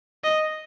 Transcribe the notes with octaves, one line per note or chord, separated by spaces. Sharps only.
D#5